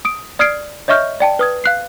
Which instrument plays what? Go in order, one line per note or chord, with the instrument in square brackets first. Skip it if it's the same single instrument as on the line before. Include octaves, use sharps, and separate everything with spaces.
[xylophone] D#6 D7
D5 D#6 F6 G#6 C7 D7
C#5 D#5 E5 C#6 F6 G6
D5 G5 A5
B4 D#6 G#6
F5 F#6 C7